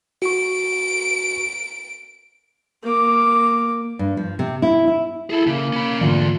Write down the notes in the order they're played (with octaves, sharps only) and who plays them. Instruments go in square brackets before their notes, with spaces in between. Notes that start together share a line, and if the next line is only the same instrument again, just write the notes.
[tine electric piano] F#4 C#6 [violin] D7
[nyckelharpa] A#3 D6
[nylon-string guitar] G2
F3
C3
E4
E4
[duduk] E4 [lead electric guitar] G#4 A4
[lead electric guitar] C#3 [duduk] A#3
[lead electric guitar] C#4 B5
[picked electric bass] G#2 D3 E3 [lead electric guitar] A3 D5 [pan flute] F4